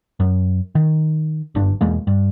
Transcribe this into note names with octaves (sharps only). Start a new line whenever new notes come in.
F#2
D#3
F#1 G2 D4
E1 E2 G#3 A#3
G2